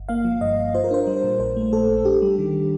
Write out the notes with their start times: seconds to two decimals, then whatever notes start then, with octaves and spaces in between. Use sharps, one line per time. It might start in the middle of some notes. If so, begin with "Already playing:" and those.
Already playing: G1
0.09 A#3 F5
0.25 F3
0.41 G2 D#5
0.58 G1
0.74 F4 C5
0.84 A#4
0.91 D4 C5
1.07 G3
1.24 A#2
1.39 A#1 C5
1.57 A3
1.73 A#2 A4
1.90 A#1
2.05 D4 G4
2.22 G3
2.39 D#3